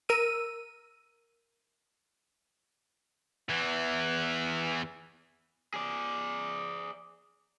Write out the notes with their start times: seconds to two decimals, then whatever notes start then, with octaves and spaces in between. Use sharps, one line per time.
0.09 A#4 E6 D#7
3.50 E2 E3
5.74 G#4 D5